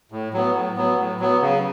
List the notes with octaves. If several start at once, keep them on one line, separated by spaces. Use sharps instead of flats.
A2
F#3 B3
A2
F#3 B3
A2
F#3 B3
C#3